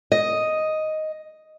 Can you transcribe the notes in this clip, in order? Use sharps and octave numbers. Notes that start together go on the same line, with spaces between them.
D#5